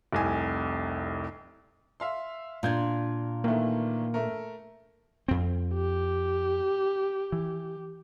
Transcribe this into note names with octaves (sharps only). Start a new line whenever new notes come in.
F1 C2 G#5
E5 F5 C6
A#2 D4 C6 G6 G#6
D#3 E3 A3 A#3
A3 A#4
F2 C4
G4
E3